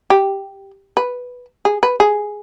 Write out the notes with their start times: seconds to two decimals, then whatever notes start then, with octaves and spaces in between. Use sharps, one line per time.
0.10 G4
0.97 B4
1.65 G#4
1.83 B4
2.00 G#4